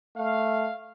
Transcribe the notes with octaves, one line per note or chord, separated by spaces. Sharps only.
A3 F5